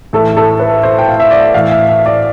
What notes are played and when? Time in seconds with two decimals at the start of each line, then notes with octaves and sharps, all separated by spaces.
0.13 A2 E3 A4
0.37 A4
0.60 B4
0.83 C5
0.99 G5
1.09 F5
1.20 E5
1.31 D5
1.54 A2 E3 F5
1.71 E5
1.89 E5
2.06 D5